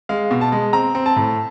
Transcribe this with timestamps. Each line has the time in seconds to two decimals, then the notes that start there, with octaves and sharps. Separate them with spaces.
0.09 G#3 F5
0.31 B2
0.41 A5
0.52 G#3
0.73 C4 A#5
0.95 C4
1.06 A5
1.16 A2